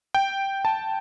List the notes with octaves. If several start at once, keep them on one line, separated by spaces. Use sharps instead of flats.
G5
A5